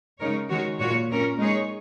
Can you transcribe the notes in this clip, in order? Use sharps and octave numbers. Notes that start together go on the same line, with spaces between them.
C#3 G#3 D#4 A#4 C#5
D#3 G#3 F#4 C#5
A#2 A#3 F#4 C#5
A#2 A#3 C#4 A#4
G#3 D#4 G#4 C#5